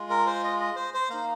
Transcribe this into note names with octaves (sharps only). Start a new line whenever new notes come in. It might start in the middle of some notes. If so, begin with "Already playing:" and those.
Already playing: G#3 F4
A#4
C5
D#5
D#5
C5
C5
A#3 D#4 F5